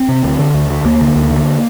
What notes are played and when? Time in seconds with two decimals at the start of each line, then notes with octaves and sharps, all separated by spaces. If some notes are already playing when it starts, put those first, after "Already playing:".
Already playing: C4
0.09 C3
0.24 D2
0.39 D3
0.54 D2
0.70 D3
0.85 D2 A#3
1.01 D3
1.16 D2
1.31 D3